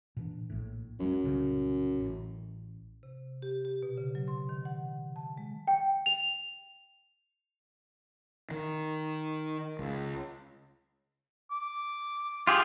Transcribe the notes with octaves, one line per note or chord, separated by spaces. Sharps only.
A#2 E3 D4
A#1 A2
F1 F#2 F#3 G#3
C2 A#2 C#3
A1
C3
G4
G4
B2
C#3
F#3
C6
D#3
F#5
A5
G#3
G5
F7
D#3
C#2
D6
F4 G4 G#4